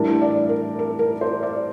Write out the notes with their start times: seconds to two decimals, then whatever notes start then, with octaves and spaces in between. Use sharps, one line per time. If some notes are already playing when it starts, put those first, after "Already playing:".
Already playing: A2 E3 G3 D4 A#4
0.22 D5
0.49 A#4
0.79 A#4
0.99 A#4
1.21 C5
1.43 D5